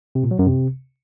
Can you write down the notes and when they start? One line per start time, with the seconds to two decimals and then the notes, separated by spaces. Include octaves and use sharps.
0.15 C3
0.23 A#2
0.31 F#3
0.39 F#2
0.47 C3